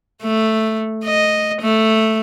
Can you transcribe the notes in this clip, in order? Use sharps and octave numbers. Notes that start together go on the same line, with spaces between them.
A3
D#5
A3